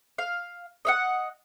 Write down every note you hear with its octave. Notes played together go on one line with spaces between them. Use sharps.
F5
D#5 E5 F#5